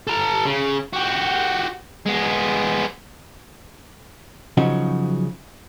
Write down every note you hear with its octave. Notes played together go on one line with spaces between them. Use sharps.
A4 A#5
C#3
F#4 G4
G#3 B3
C#3 F3 F#3 D#4 F#4